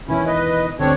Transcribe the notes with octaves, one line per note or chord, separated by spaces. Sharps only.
E1 D#3 E3 C#4 E4
B4 D#5
D2 G2 D3 C4 D4 C#5